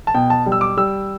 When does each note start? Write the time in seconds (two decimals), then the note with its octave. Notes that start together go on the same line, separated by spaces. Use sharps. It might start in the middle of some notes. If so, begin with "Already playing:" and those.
0.07 A5
0.14 B2 G5
0.30 A5
0.46 G3
0.52 E6
0.61 D6
0.77 G3 E6